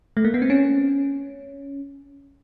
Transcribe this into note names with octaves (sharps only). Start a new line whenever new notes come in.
A3
A#3
B3
C4
C#4